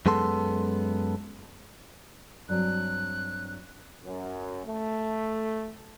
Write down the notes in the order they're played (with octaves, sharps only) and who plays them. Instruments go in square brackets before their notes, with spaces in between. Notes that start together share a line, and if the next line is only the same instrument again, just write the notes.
[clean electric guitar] F#2 G#3 B3 A4 C6
[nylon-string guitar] G2 F#3 C4 [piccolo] F#6
[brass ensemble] F#2
A3